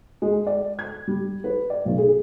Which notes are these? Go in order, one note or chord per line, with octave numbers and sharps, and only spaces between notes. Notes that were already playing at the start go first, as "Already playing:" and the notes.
G#3
D5
G#6
G3
B4
D5
B1
G#4